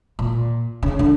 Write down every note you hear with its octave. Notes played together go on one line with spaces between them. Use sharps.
A#2
C#3
D3